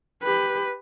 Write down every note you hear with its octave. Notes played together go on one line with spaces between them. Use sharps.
G4 B4